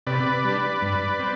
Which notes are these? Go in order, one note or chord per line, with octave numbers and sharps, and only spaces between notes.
C3 B4 D5
G3 D4
G2
C4